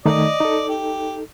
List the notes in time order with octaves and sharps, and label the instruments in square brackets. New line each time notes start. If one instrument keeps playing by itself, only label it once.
[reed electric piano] D#3 A3 D#4 [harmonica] D5 D#5
[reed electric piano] D#4 A4
[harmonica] G4